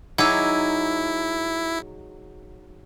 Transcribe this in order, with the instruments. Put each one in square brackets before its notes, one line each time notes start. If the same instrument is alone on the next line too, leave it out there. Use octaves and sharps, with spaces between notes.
[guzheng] F#3 D#4 G#4 [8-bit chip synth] E4 [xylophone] F#5 D6 E6